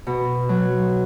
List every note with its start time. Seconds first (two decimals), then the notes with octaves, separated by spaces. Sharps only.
0.07 B2
0.49 F#3